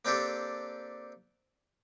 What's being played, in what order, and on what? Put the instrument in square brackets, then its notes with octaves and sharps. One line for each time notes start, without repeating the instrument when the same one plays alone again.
[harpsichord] A#3 C4 D4 G4 A4